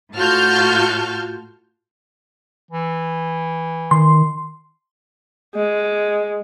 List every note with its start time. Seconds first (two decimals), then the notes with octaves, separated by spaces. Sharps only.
0.15 A2 F4 F#4 A5 F6 G6
2.71 E3
3.91 D#3 C6
5.55 G#3